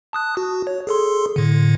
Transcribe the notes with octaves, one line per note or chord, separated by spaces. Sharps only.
A5 D#6 F#6
F#4
C#5
G#4 A4 C6
A2 D3